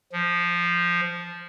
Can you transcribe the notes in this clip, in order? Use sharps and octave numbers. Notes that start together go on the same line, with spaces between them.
F3